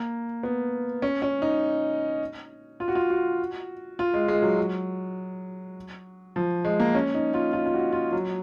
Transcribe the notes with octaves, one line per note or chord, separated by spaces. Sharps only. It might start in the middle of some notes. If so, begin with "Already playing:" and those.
Already playing: A#3
B3
C#4
C#4
D#4
F4
F#4
F4
F#4
F4
G#3
G#3
F#3
F#3
F3
G#3
A#3
C#4
D#4
F4
F4
F4
F#4
F4
F#3